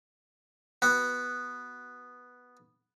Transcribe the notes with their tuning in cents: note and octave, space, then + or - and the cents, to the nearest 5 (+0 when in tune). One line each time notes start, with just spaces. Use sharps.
B3 +0 F#4 +0